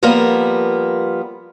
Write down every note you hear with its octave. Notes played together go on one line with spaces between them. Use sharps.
F3 G3 A#3 B3 A#4